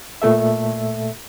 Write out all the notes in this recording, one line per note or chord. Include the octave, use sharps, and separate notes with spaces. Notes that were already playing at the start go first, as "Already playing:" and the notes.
A#2 A3 A4 E5